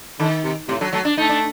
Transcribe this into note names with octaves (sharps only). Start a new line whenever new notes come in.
D3 D#3
C3
A2 C3
D3 F#3
F#3 A3
D4
A3 D#4
D4